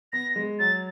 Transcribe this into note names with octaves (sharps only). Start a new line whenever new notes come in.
B3 A#6
G#3
F#3 A6